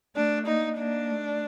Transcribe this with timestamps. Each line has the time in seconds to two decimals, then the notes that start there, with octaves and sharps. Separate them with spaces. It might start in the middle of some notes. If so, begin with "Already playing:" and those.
0.15 A3 D4
0.46 A#3 D#4
0.78 A#3 D4
1.11 A3